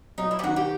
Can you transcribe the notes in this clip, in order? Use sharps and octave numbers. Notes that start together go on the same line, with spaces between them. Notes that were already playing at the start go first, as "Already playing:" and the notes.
F#3 D#4
E4
G4
D#3 F#4
G4